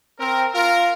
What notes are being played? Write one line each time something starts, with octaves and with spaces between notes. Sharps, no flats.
C4 A#4
F4 A#4